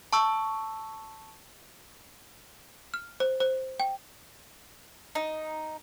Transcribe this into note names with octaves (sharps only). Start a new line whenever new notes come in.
A5 C#6 E6
F6
C5
C5
G5
D#4